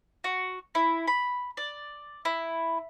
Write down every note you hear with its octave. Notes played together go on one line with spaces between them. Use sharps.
F#4
E4
B5
D5
E4